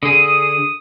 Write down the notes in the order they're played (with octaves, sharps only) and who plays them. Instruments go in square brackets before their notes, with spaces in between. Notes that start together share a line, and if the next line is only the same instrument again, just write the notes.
[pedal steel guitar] D3 G#4 [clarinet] D#6